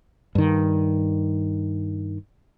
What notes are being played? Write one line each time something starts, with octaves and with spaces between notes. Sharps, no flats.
G2 D#3